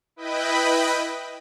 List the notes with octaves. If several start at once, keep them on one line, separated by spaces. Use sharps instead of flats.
E4 B4 D#5 G5 B5